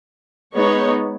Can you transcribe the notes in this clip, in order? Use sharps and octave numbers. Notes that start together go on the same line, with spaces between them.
G#3 B3 D#4 C#5